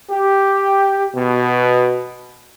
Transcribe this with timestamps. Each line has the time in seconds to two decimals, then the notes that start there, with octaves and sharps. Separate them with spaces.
0.10 G4
1.15 B2